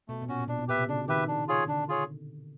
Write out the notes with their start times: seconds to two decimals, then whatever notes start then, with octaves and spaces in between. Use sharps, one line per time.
0.08 B2 A3
0.22 B2
0.28 A#2 C#4 F#4
0.40 A#2
0.48 B2 D4
0.59 B2
0.68 A#2 G4 B4 E5
0.78 C3
0.89 C#3 D4
1.08 D#3 G4 B4 E5
1.28 D4
1.48 F4 G#4 C#5
1.68 D3 D4
1.88 F4 G#4 C#5